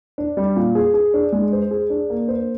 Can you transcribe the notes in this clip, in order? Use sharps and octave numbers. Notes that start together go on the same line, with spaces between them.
D4
G3
A#2
G#4
G#4
D4
G#3
C5
G#4
D4
A#3
C5